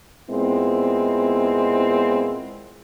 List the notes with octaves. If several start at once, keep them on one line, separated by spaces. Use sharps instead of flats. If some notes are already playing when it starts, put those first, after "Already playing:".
A#2 G#3 B3 C4 E4